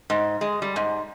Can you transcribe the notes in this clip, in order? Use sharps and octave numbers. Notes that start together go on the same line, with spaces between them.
G#2
G#3
G3
G#2